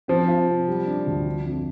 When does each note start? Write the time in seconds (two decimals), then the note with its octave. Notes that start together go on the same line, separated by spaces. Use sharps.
0.08 F3 C4
0.28 F4
0.47 C3
0.68 G3
0.86 D4
1.07 D2
1.26 D4
1.46 F2